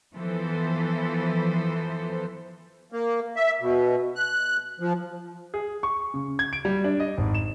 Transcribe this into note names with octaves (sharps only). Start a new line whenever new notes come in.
E3 F3 B3 A4 C5
A#3
E5
B2
F#6
F3
G#4
C#6
C#3
G#6
D7
G3
D4
D#5
G#1
E7